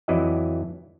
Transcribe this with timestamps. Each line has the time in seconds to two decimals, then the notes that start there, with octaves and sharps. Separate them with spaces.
0.08 F2 E3 F#3 E4 D5 D#5